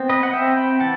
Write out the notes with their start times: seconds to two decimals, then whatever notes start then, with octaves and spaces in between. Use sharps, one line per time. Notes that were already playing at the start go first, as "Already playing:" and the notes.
Already playing: B3 C4
0.09 B4 D#5
0.23 F#5
0.33 C4 E5 G5
0.57 G5 B5
0.80 E3 F#5 A5